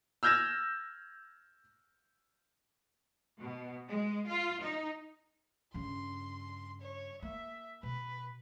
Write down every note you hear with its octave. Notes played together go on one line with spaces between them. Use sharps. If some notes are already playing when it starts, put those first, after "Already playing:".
E6 F6 G6 G#6 A#6 E7
B2
G#3
F4
D#4
G2 C#3 C6
C#5
A#3 E5
B2 B4